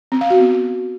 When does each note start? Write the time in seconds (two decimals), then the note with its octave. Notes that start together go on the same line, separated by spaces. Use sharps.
0.12 C4
0.21 F5
0.30 F#4
0.40 B3